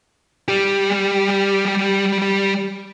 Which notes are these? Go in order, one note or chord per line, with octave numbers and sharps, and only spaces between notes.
G3 G4